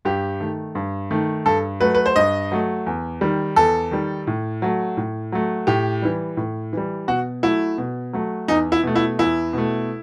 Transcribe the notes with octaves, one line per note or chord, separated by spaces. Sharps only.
G2 G4
D#3 A3
G2
D#3 A3
G2 A4
F#3 A3 B4
B4
C5
G2 D#5
F#3 A3
E2
D#3 G3
E2 A4
D#3 G3
A2
F#3 A3
A2
F#3 A3
A2 G4
E3 G3
A2
E3 G3
B2 F#4
F#3 A3 E4
B2
F#3 A3
E2 D#4
E4
B2 A3
E4
E2 E4
B2 A3